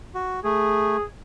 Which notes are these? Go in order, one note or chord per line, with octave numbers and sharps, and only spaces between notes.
F#4
A3 G#4